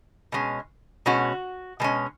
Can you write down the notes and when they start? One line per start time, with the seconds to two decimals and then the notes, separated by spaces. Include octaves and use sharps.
0.32 B2 G#3 C#4
1.06 B2 G#3 C#4 F#4
1.80 B2 G#3 C#4